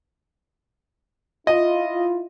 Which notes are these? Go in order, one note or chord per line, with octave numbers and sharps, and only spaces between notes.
E4 F4 D#5